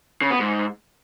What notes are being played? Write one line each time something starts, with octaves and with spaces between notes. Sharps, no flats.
C#3
B3
G#2